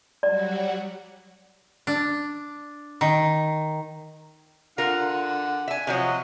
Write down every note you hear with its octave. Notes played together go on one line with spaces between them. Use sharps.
F#3 G3 F#4 D5
D4
D#3
D3 F4 A#4 F#5
E5 G#5
C3 F3 F#3 D#5 F#5